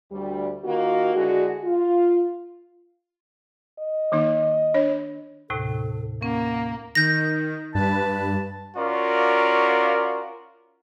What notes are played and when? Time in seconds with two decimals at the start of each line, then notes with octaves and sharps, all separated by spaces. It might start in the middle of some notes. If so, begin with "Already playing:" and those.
0.12 D2 G3
0.64 D#3 A#3 F4 F#4
1.15 D3 G#3 D4 E4 F#4
1.64 F4
3.80 D#5
4.12 D#3 A#3 D#4
4.74 D4 C#5
5.50 D#2 A2 C3 A4
6.22 A#3 C#4 F#5
6.95 D#3 G6 A#6
7.75 G2 B4 A5
8.77 C#4 F4 F#4 A#4 D5